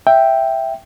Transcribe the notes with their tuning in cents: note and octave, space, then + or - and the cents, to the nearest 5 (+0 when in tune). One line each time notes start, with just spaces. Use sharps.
E5 +0 G5 +0